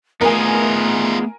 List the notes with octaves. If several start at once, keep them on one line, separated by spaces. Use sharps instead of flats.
A3 B3 D#4 F4 G#4 A#4 G#5